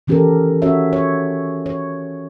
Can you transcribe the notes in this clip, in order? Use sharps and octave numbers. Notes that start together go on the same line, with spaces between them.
D#3 E3 C#4 G4 A4 A#4
C#4 F#4 C#5 E5
C#5
C#5